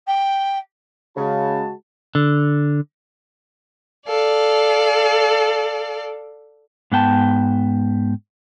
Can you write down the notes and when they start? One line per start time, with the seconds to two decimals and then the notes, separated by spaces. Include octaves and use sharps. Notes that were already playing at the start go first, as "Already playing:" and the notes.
0.07 G5
1.17 C#3 G#3 F#4 A5
2.15 D3
4.07 A4 D5 F5
6.92 G#2 B3 G5 A5